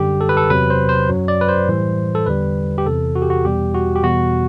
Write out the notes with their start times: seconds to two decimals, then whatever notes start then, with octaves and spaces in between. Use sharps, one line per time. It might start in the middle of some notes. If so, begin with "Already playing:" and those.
Already playing: F#2 D3 G3 G4
0.21 A4
0.29 B4
0.37 A4
0.50 E2 C3 F#3 B4
0.70 C5
0.89 C5
1.09 F#2 F#3
1.28 D5
1.41 B4
1.49 C5
1.68 A2 E3 G3
2.15 A4
2.26 E2 D3 G3 B4
2.78 G4
2.86 E2 C3 E3 A4
3.15 F#4
3.22 G4
3.30 F#4
3.45 E2 B2 G3 G4
3.74 F#4
3.95 G4
4.03 E2 B2 G3 F#4